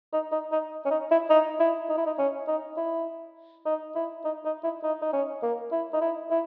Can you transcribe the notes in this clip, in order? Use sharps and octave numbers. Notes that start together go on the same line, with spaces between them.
D#4
D#4
D#4
C#4
D#4
E4
D#4
E4
D#4
E4
D#4
C#4
D#4
E4
D#4
E4
D#4
D#4
E4
D#4
D#4
C#4
A#3
E4
D#4
E4
E4